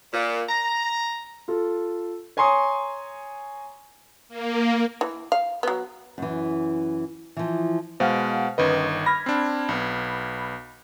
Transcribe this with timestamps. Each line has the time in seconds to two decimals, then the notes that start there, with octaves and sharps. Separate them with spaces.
0.14 A#2
0.49 A#5
1.48 F4 A4
2.37 C#5 G#5 A#5 C6 C#6 D#6
4.29 A#3
5.01 E3
5.32 F5
5.63 F#3 B3
6.18 F#2 E3
7.37 E3 F3
8.00 B2 G#3 C5 F5 F#5
8.58 G1 D#3 C#4 B4 D#5
9.06 B5 F6 G#6 A#6
9.26 C4 D4
9.69 B1 B3